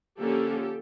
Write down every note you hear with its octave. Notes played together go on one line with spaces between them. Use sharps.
D3 F3 A#3 C#4 G4 A4